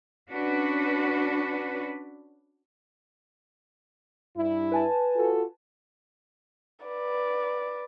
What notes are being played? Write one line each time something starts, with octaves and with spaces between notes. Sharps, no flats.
C#4 D4 F#4 B4
G2 E4
B4 G#5 A5
F4 F#4 A4
B4 D5